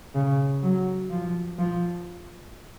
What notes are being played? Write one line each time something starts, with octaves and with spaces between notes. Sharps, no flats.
C#3
F#3
F3
F3